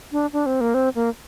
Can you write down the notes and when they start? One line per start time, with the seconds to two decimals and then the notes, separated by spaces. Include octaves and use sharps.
0.12 D4
0.33 D4
0.46 C4
0.61 A#3
0.74 C4
0.95 A#3